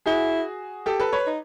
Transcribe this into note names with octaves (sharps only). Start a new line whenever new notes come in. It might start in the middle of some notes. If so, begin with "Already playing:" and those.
E4 F#4 G#4
G4 A4
A4 B4
B4 C#5
D#4